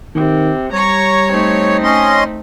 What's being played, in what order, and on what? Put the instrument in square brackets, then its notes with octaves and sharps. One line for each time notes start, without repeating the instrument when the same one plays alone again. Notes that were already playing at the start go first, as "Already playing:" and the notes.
[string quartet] C3 [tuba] D#3
[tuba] G3 [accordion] C#5 [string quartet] A#5 C#6
[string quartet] A3 C4 D#4
[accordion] C#4 D#5 C6